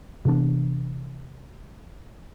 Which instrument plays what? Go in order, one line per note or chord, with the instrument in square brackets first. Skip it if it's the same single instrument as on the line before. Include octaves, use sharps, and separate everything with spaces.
[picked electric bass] C3 E3 B3 D4